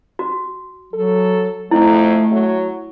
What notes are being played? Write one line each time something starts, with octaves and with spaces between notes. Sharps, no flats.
F#4
F#3 A4
F2 A3 E4
F#3